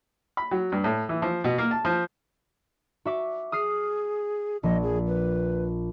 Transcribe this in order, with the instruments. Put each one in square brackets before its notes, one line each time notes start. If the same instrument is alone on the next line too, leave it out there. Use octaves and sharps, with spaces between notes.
[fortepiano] B5
F#3
G2
A2
E3
F3
B2
A#3
A5
F3
[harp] F#4 E5 D6
[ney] G#4 [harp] D#6 F6 C7
[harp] A#1 [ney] D#5
[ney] G#4
B4